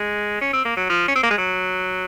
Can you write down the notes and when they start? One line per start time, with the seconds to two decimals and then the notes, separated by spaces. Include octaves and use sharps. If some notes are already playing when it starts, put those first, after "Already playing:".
Already playing: G#3
0.41 C#4
0.53 C4
0.65 A#3
0.77 F#3
0.89 F3
1.08 C#4
1.15 C4
1.23 A#3
1.30 G#3
1.38 F#3